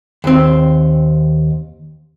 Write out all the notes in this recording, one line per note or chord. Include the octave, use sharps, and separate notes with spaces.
D#2 C4